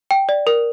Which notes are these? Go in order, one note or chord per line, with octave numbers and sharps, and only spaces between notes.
G5
D5
A#4